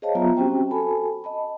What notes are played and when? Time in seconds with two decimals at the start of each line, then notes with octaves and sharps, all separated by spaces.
0.02 G#4 C5 C#5 D#5 F5 A5
0.15 F#3 B3 F4 E5 A#5
0.37 C4 C#4 F#4 G4 C5 G5
0.71 F#4 A4 G#5 A5 B5
1.24 D#5 A5 B5